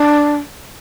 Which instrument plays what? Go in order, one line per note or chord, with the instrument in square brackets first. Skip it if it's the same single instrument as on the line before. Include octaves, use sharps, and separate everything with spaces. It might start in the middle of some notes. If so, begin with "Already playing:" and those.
Already playing: [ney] D4